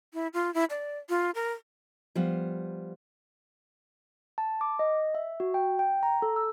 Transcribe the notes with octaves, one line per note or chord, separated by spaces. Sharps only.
E4
F4
E4
D5
F4
A#4
F3 G3 B3 F5
A5
D6
D#5
E5
F#4
G5
G5
A#5
A4
E6